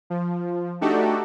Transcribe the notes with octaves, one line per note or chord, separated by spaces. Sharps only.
F3
A3 D4 D#4 F#4 G4 A4